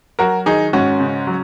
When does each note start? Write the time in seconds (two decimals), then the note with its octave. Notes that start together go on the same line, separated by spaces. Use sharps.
0.19 F#3 F#4 A#4
0.46 D#3 D#4 G#4
0.73 G#2 C#4 F#4
1.00 C#3
1.27 F#3